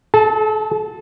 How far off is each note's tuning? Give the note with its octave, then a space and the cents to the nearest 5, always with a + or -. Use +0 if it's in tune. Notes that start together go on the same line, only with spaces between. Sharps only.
A4 -40 A5 +0